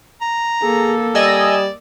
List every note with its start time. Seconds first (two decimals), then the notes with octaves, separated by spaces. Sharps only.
0.21 A#5
0.62 A#3 G#4 A4
1.15 G3 D5 D#5 G#5 E6